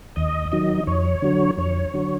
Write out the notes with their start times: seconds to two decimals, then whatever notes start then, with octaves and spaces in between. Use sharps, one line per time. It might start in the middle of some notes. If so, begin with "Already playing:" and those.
0.16 D#2 D#5
0.52 D#3 F#3 D#5
0.87 F2 C#5
1.22 D3 F#3
1.57 F2 C#5
1.94 D3 F#3